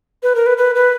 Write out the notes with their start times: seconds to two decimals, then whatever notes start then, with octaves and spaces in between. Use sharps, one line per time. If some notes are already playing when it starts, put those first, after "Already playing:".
0.23 B4
0.35 A#4
0.46 B4
0.58 B4
0.75 B4